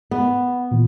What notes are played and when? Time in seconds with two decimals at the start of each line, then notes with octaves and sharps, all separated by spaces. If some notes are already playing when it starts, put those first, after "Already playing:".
0.11 B3
0.71 A#2 E3